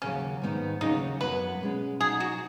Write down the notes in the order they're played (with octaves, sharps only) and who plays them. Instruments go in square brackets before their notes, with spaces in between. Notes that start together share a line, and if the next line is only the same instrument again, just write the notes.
[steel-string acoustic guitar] D#2 C#3 F#3 [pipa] C#4
[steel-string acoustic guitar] G#2 D#3 B3 D#4
[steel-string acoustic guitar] D#2 C#3 F#3 C#4 [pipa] D#4
[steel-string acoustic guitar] F#2 F#3 B3 [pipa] B4
[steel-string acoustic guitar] B2 G#3 C#4
[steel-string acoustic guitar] B2 F#3 D#4 [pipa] G#4
[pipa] F#4